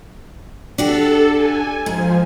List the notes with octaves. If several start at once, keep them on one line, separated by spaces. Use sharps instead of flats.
D4 F#4 G4 A4
G#5
G#2 F3